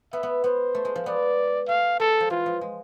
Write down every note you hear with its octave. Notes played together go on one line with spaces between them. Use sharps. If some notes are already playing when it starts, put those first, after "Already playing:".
B3 E5
B3
B3 C5
A3
G#3
F3
B3 D5
A3 F5
G#3 A4
F3
E3 F4
F3
G#3